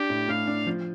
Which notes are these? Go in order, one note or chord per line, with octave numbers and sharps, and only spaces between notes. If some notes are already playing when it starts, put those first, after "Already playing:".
Already playing: D4 G4
A2
A2 F5
D4
F3